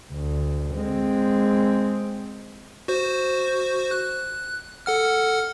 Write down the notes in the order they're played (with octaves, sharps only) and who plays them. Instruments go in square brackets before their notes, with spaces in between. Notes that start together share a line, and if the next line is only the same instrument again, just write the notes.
[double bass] D2
G#3 C4
[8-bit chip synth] F#4 C5
F#6
A4 F#5 F6